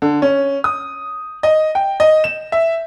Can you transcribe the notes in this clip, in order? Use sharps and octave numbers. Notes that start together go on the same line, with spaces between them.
D3
C#4
D#6
D#5
G5
D#5
E7
E5